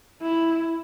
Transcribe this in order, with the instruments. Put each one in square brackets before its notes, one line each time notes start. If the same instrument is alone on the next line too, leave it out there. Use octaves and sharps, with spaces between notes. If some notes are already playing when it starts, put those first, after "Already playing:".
[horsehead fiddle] E4